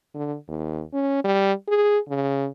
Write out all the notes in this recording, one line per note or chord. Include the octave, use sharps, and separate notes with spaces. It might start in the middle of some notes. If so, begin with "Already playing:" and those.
D3
D#2
C#4
G3
G#4
C#3